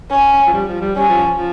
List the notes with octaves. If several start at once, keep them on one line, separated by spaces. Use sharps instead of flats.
C#4
F3
G3
F3
G3
G3 C#4
F3
F3